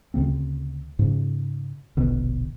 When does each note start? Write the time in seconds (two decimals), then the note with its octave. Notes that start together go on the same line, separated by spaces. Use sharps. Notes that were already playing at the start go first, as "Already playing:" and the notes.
0.14 D2 C#3 A#3 C4
0.99 G#2 C#3
1.97 E1 A#1 B2 D3